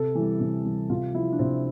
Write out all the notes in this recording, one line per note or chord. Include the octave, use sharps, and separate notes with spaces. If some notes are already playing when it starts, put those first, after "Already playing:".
Already playing: C3 A4
E3 G3
C3
E3 G3
C3 F4
F3 E4
D4
C3 C4